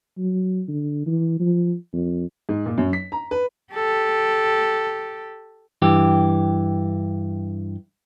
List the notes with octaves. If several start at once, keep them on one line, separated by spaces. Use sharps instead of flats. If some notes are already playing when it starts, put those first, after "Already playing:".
F#3
D3
E3
F3
F2
G#2
A#2
F#2
B6
A#5
B4
G4 A4
G2 E3 G4